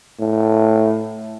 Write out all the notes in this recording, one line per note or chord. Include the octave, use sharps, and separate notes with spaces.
A2